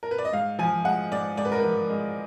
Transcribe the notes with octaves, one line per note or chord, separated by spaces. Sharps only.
A#4
B4
D5
D#5
G#2 F5
F3 G#5
G#3 F#5
G#2 D5
G#2 D5
B4
A#4
F3 B4
G#3